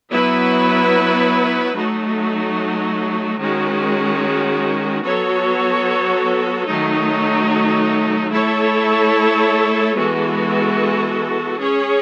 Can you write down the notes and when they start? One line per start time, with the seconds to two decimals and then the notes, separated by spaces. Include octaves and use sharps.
0.10 F#3 B3 E4 B4
1.75 F#3 A3 D#4 F#4
3.38 D#3 G#3 C#4 F#4
5.03 F#3 B3 F#4 A4 C#5
6.66 D#3 F#3 A3 D#4
8.30 A3 E4 A4 C#5
9.94 E3 G#3 B3 F#4 A4
11.58 C#4 G#4 C#5